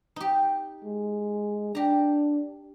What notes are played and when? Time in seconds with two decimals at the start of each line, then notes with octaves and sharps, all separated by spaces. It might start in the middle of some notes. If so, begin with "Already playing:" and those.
0.16 D#4 G4
0.84 G#3
1.75 D4 G4 A#5